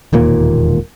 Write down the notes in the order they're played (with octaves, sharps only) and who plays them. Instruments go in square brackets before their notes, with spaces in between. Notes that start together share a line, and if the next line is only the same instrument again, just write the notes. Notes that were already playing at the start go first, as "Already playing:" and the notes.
[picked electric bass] E1 D#2 A#2 A#3